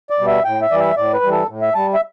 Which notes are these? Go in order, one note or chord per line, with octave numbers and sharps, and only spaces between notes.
D5
B2 G3
E5
A2 G5
E5
E3 G3 D5
E5
A2 D5
B4
E3 G3
A4
A2
E5
G3 A5
E5